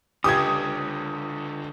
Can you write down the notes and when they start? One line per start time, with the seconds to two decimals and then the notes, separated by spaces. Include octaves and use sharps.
0.24 C#2 D3 F4 G4 D#6 G#6